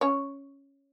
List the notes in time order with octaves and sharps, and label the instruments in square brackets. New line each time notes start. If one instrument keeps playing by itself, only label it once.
[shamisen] C#4 C#5